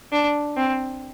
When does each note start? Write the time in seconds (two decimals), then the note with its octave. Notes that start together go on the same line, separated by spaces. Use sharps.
0.12 D4
0.57 C4